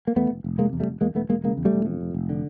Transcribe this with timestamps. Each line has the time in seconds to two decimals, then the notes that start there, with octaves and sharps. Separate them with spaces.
0.07 A#3
0.16 E2 A3 B3
0.31 F1
0.44 F1
0.58 C3 G#3 A#3
0.73 E2
0.80 G3 A3
0.87 F1
1.01 E2 G#3 A#3
1.15 E1 A3 B3
1.29 E1 G#3 A#3
1.44 C#3 G#3 A#3
1.57 E2
1.65 G3 A3
1.73 E1
1.86 F2
2.01 F1
2.14 F1
2.29 D3